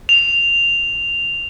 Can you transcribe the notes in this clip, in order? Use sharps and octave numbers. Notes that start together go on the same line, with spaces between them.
F7